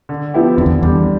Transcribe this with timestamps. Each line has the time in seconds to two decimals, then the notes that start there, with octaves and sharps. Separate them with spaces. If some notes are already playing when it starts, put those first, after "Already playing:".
0.09 D3
0.34 F3 B3 E4 G4
0.57 F2 D3
0.66 E2
0.81 E2 G3 D4